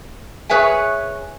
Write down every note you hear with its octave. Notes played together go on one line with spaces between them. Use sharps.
G#4 B4 C#5 E5 G#5